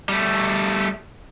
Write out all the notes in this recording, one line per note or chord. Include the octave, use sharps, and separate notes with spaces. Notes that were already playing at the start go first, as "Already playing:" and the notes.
G3 A3